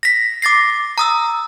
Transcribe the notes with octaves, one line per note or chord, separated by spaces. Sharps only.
A#6 B6
D6 A6 A#6 C7
A#5 D#6 E6